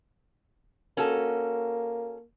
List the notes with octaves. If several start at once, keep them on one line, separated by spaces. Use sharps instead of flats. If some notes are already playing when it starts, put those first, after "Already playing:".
A#3 C#4 F#4 A4